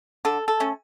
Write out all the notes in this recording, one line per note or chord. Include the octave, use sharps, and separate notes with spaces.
D3 A4
A4
A3 C#4